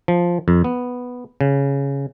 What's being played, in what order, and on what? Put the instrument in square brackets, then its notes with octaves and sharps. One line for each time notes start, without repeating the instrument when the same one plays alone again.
[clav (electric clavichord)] F3
F2
B3
C#3